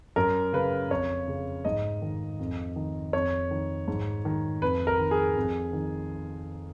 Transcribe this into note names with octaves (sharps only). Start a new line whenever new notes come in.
F#2 A#4
C#3 B4
F2 C#5
C#3
G#2 D#5
D#3
F2
D#3
F2 C#5
D#3
G#2
D#3
F2 B4
A#4
D#3
G#4
F2
D#3